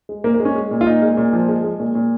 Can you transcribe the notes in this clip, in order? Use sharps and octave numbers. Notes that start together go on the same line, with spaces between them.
G#3
A#2 A#3
A#3
G#3
C#4
G#3
A#2
F4
A#2 D#4
G#3
A#2
F3
G#3
G#3
A#2
A#2